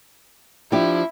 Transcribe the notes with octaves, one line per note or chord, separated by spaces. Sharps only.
F3 D4 E4 G4